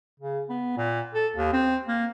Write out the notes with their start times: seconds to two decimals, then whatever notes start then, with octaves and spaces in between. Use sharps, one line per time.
0.20 C#3
0.49 B3
0.77 A#2
1.14 A4
1.36 D#2
1.53 C4
1.88 A#3